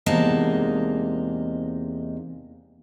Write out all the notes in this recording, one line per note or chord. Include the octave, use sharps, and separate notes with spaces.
E2 C3 G#3 A#3 D#4 A5